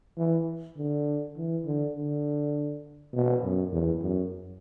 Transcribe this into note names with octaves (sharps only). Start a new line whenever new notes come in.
E3
D3
E3
D3
D3
B2
F#2
E2
F#2